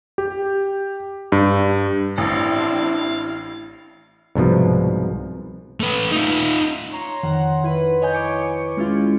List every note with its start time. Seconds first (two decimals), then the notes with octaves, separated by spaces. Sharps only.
0.18 G4
1.32 G2
2.18 A1 C4 D4 E4 F5
4.35 C2 G#2 B2 F3
5.80 A3 B4
6.11 D#4 F4
6.92 C#5 A#5 C6
7.23 F2 D#3 F#5
7.63 D#3 E4 B4 B5
8.02 C#5 D#5 G#5 G6
8.14 C#6 D6 C#7
8.77 G#3 C#4 E4 F4